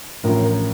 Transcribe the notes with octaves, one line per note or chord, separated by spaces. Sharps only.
A1 A2 F3 A#4
A#4